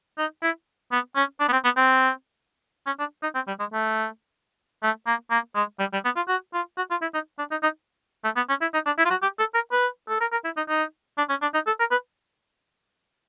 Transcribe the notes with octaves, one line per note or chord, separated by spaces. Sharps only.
D#4
E4
B3
C#4
D4
B3
C4
B3
C4
C#4
D4
D#4
C4
G3
G#3
A3
A3
A#3
A#3
G#3
G3
G3
B3
F4
F#4
F4
F#4
F4
E4
D#4
D4
D#4
D#4
A3
B3
C#4
E4
D#4
D4
E4
F4
F#4
G4
A4
A#4
B4
A4
A#4
A#4
E4
D#4
D#4
D4
C#4
D4
D#4
A4
A#4
B4